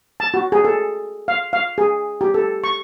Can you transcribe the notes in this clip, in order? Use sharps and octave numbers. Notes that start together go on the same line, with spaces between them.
A5
F#4
G#4
A4
F5
F5
G#4
G4
A4
C#6